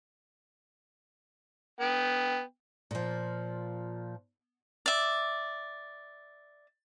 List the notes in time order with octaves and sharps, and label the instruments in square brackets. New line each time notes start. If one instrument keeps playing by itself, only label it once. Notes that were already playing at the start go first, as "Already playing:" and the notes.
[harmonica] B3 G5
[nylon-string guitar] A#2 F3
[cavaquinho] D5 E5